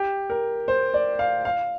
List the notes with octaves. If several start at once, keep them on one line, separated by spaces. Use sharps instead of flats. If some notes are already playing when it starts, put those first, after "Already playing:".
Already playing: G4
A#4
C5
D5
F5
F5